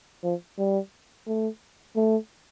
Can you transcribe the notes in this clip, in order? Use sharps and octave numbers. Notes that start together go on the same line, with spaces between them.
F3
G3
A3
A3